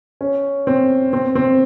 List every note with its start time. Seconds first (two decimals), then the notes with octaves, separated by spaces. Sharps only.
0.21 C#4
0.67 C4
1.13 C4
1.35 C4